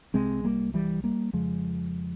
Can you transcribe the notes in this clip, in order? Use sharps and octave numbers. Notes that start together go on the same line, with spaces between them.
C2 C3 G#3 C4
G3 A#3
E3 G3
G3 A#3
F2 C#3 F3 G#3